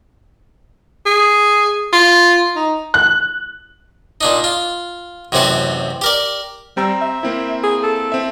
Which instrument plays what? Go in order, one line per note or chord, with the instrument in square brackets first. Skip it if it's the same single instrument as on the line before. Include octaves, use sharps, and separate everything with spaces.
[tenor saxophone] G#4
F4
D#4
[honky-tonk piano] F#6
[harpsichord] A#2 D4 D#4
F4
A1 F#2 C3 C4 F#4 G4
G4 A#4 D5
[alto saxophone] G3 [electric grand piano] C4 A#5 E6
[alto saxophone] E5
[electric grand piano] A#3 C4 E4
[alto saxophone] G#4
A4
[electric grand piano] C4 E5